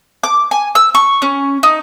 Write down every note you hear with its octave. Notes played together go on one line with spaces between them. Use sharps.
D6
G#5
E6
C#6
C#4
D#4